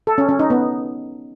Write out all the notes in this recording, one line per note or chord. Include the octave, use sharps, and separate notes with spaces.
A4
C#4
C#4
D#4
B3